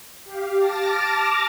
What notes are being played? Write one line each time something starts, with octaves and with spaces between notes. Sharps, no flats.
G4 F5
A5 D6 F6 A6 A#6